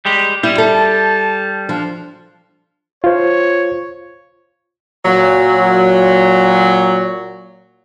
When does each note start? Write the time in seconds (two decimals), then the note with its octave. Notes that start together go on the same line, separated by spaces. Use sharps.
0.05 G3 G#3 G4
0.43 G3 E4
0.58 A4
0.75 A5
1.69 F3 D4
3.04 F4 C5 C#5
5.05 A#2 F#3